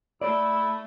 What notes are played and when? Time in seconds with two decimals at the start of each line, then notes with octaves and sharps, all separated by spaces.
0.21 A3 E4 D5